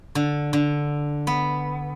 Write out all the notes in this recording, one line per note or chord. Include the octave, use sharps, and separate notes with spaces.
D3
D3
B3